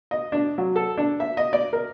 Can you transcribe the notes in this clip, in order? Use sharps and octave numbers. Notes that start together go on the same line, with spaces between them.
D#5
D4
F#3
A4
D4
E5
D#5
D5
A#4